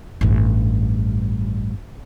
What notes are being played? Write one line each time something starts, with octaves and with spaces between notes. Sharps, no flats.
A1 G2